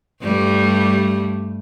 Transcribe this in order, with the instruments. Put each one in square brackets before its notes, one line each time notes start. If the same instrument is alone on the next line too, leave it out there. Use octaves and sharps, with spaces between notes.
[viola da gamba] G2 G3 A3